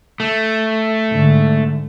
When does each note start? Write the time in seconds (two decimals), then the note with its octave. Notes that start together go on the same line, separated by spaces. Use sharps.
0.20 A3
1.10 G#2 D3